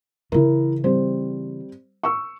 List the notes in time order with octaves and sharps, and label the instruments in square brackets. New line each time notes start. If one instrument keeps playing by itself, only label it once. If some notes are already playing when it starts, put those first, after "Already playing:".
[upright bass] C#3 E3 [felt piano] E4 A#4
[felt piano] G3 C4 C5
C#6 E6